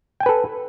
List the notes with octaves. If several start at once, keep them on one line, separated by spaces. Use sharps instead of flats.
A4 B4 G5 G#5